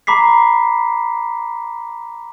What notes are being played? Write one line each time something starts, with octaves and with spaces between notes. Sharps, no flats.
A#5 B5 D6 B6 C7